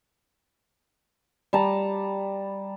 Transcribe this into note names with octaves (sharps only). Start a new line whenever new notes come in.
G3 A5 A#5